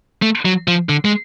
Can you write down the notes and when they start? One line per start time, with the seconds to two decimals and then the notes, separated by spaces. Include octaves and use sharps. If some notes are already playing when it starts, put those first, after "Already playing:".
0.22 A3
0.45 F#3
0.68 F3
0.89 D3
1.05 G#3